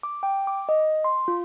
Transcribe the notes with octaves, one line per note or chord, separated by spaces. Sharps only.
D6
G5
D6
D#5
C6
F4